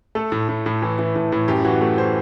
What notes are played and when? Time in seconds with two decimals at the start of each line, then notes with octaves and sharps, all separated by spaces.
0.15 A3 A4
0.32 A2
0.49 A2
0.66 A2
0.82 E3
0.99 E3
1.16 A2
1.32 A2
1.48 F#2 G4
1.65 E3 F#4
1.81 A3
1.98 E3 C5